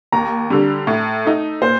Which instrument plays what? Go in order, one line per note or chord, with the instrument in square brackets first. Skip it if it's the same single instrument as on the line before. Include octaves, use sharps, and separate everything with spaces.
[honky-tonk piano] D#2 [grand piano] A#5
[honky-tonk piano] D3 G3
A2
A3 D#4
[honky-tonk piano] A#2 [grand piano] C5